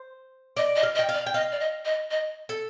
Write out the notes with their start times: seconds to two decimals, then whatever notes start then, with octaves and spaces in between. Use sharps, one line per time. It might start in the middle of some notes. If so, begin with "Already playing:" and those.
Already playing: C5
0.57 D5 D#5
0.76 D#5
0.83 F5
0.95 D#5
0.99 G5
1.09 F5
1.14 D5
1.26 G5
1.34 D#5 F5
1.52 D5
1.60 D#5
1.85 D#5
2.11 D#5
2.49 A4